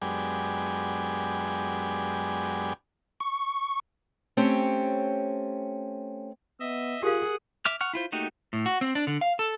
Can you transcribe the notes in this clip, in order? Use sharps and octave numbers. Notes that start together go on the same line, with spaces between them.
F#2 G#3 B3 D4 G4 G#5
C#6
A3 C4 C#4 G4 C5 C#5
B3 D#5 E5
F4 G4 G#4 A#4 F5 F#5
E5 D6 F6
F#5 C#6 F6
E4 F4 C5
A3 A#3 D#4 F#4 G4
A2
F#4
C4
D4
D3
F5
A4